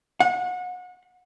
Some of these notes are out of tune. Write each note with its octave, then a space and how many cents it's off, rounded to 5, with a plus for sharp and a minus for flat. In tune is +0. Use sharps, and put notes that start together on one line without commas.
F#5 -30